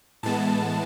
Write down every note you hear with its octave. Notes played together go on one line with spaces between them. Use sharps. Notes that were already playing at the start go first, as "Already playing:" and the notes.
A2 E3 G#3 B3 A5